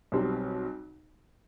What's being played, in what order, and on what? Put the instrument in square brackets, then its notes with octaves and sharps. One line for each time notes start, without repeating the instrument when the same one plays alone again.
[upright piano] B1 B2 G3 C4